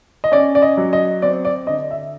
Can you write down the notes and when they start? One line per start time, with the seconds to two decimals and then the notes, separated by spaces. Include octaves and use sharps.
0.24 D#5
0.32 C#4 D5
0.55 D5
0.62 D#5
0.77 F#3
0.93 D#5
1.22 C4 D5
1.45 D5
1.67 D3 D#5
1.91 E5